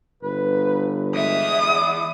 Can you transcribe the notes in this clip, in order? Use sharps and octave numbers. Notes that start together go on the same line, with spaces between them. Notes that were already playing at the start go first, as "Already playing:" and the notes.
G1 B4
E2 G#3 E5 D#6